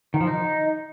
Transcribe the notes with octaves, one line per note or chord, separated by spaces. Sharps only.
D#3
F3
D#4